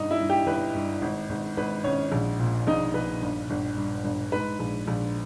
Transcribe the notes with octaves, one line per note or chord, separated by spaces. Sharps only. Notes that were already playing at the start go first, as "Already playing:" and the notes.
Already playing: G1 G2 D#4 D#5
E4 E5
G2
G4 G5
G1 B4
G2
G#1
G#1
G#1 B4
G#1 C#4 C#5
A#1
A#2
A#1 D#4 D#5
A#1 B4
G1
G1
G2
G1
G#2 B4
A#1
A#1